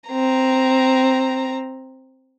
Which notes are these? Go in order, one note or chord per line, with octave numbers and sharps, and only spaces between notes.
C4 A#5